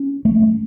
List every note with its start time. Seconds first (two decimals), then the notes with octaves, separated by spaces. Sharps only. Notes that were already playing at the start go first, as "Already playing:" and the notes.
Already playing: C#4
0.25 A3